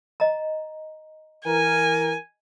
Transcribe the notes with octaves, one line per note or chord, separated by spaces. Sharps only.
D#5 A#5
E3 A#4 G#5